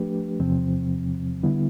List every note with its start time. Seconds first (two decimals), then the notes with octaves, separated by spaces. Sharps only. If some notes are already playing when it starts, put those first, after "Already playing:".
Already playing: F3 A3 D4 G4 B4
0.40 E2 C3 F3 C4
1.43 D3 G3 B3 E4